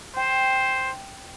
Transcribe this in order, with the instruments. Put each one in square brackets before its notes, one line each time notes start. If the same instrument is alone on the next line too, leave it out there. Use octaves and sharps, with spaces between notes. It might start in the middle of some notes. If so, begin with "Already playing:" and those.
[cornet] C5 [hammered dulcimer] G5